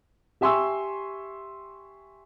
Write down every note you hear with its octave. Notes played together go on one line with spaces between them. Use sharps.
G4 E5 G#5 C6 C#6 E6